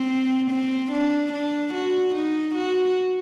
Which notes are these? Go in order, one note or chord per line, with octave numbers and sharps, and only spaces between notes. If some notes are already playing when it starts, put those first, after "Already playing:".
Already playing: C4
C4
D4
D4
F#4
D#4
F#4